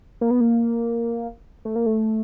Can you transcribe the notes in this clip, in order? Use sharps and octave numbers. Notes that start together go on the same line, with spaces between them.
A#3
B3
A#3
A3
A#3
A3